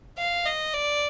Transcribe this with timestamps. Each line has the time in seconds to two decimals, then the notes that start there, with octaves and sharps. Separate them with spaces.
0.18 F5
0.46 D#5
0.74 D5